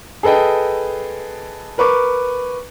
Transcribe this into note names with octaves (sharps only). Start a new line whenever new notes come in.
G#4 A4 B4 D#5 G5
A#4 B4 C#6 D6